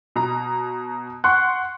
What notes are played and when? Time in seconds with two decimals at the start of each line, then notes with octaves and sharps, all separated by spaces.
0.16 B2 A#5
1.24 F#5 C6 C#6 F#6